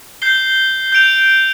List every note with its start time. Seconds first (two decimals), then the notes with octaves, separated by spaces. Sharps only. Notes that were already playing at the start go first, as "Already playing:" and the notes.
0.22 G6 C7 G7
0.92 G6 D7 F7